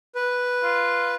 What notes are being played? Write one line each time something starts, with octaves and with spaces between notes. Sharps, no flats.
B4
F4